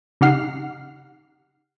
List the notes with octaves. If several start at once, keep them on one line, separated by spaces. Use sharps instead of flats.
C#3 D#4 G4 F#5 F6 C7